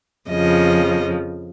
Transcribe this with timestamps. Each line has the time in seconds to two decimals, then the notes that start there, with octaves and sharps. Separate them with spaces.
0.30 F2 C#3 F3 D#5